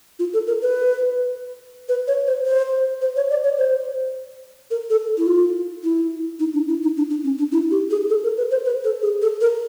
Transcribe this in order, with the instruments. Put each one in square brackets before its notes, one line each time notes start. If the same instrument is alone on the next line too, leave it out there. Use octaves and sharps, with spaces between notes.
[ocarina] F4
A4
A#4
B4
B4
C#5
C5
C5
C5
C#5
D5
C#5
C5
A#4
A4
E4
F4
E4
D#4
D4
E4
D#4
D4
D4
C#4
D4
E4
G4
G#4
A4
A#4
B4
C5
B4
A4
G#4
A4
A#4